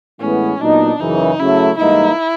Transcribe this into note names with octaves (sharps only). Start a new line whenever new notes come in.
A2 E3 G#3 B3 C#4
A#2 F#3 B3 D4 D#4
F#2 C#3 E3 D#4
C#3 F#3 A3 E4
G#2 E3 G3 A#3 D#4 E4